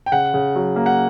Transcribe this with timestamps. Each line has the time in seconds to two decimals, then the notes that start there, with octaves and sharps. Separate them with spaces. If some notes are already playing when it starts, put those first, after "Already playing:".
0.06 G5
0.12 C#3 F#5
0.34 C#3
0.55 F#3
0.76 A#3
0.86 F#5